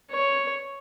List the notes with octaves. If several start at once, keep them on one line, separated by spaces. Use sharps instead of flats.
C#5